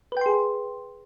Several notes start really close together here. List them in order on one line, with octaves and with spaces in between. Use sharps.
B4 G5 C6 G#4